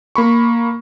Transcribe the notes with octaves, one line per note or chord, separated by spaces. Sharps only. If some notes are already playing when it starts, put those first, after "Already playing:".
A#3 B5 C#6